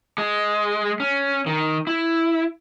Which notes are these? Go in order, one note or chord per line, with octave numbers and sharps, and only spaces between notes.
G#3
C#4
D#3
E4